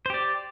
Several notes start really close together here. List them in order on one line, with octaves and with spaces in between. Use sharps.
C5 G4 D5